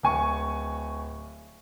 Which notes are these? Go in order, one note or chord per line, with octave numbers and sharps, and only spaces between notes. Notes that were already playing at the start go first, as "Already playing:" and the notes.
D1 G#5 C#6